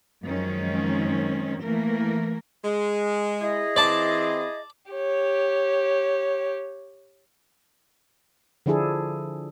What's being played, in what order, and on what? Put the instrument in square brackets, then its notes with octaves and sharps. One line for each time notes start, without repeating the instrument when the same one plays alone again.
[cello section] F#2 D#3 F3 G#3 C4 C#4
E3 A3 A#3 A#4
[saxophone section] G#3
[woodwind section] E4 G#4 D#5
[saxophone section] E3 C4 [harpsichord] D5 A5
[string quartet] G4 C#5
[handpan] D3 F3 D4 E4 G#4 A4